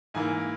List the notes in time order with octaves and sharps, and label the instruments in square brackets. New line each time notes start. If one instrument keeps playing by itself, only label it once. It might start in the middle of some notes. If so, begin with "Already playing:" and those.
[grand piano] G#2 E3 A#3 G#5